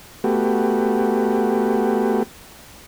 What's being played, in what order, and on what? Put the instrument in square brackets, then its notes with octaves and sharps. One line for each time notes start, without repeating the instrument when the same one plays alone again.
[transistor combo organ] A3 B3 F#4 G4